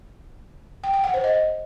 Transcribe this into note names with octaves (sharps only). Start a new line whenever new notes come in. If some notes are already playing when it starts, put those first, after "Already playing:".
G5
G5
F#5
C5
D#5